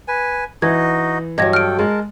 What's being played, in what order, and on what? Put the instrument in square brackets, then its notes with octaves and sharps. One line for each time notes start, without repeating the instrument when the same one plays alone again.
[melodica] B4 G#5
[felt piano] E3 [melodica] D#4 F#4 D#5 [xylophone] G#6
[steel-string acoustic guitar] G2 F#3 [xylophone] D#5 G#6 A#6
[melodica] A4 G5 [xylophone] F6 D7
[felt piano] G#3 [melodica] A#4 A5